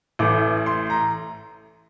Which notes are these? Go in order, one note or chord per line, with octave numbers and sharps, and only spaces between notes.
A1 A2 E3 A3 D6
C6
A#5